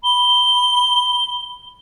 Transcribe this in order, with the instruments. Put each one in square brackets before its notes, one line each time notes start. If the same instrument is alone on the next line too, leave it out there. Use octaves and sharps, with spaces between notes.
[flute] B5 [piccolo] G7